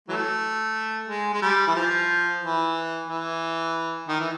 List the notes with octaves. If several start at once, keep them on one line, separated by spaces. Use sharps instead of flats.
E3 F#3 A3
G#3
G#3
G3
E3
F3
E3
E3
D#3
E3